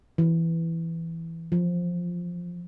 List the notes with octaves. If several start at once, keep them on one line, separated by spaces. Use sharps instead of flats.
E3
F3